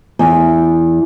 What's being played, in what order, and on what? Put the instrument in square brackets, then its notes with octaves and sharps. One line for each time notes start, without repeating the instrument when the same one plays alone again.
[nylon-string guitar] E2